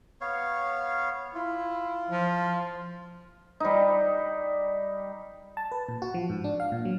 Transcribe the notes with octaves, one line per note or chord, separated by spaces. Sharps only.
B3 C#5 F5
E4 F4
F3
G3 D#4
A5
B4
A#2
F#4
F3
G#2
D4
F5
A#2
F#3